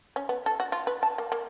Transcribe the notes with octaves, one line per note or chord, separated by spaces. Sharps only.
C#4
B3
A4
F#4
F4
B4
A5
A#3
A#3